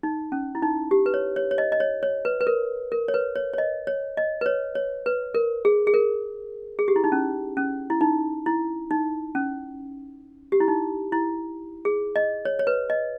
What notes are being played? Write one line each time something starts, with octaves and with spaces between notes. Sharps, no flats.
D#4
C#4
E4
D#4
G4
B4
C#5
C#5
C#5
D#5
D#5
C#5
C#5
B4
B4
A#4
A#4
C#5
B4
C#5
C#5
D#5
C#5
D#5
B4
C#5
C#5
B4
A#4
G#4
G#4
A#4
G#4
G4
E4
D#4
C#4
C#4
E4
D#4
E4
D#4
C#4
G4
E4
D#4
E4
G#4
D#5
C#5
C#5
B4
D#5